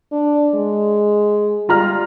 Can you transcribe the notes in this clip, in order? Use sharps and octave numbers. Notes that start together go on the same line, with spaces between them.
D4
G#3
G3 F4 A#5 F6